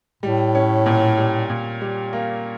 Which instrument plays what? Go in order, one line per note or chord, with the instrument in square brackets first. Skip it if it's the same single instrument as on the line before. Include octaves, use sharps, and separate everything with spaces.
[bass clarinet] A2 [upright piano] G3
[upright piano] C#4
A#2
G3
A#2
G3
A#3